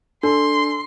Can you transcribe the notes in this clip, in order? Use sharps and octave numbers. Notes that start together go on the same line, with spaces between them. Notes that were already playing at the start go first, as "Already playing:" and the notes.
D4 A4 C6